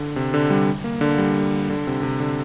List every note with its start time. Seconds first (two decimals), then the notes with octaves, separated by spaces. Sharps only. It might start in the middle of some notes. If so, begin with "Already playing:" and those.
Already playing: D3
0.16 C3
0.34 D3
0.50 G3
0.84 A#3
1.01 D3
1.18 G3
1.70 D3
1.87 C3
2.03 C3
2.20 D3